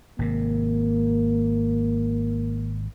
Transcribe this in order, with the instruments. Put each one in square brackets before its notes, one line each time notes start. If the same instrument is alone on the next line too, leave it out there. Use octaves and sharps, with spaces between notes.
[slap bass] G#1 C3 [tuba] A#3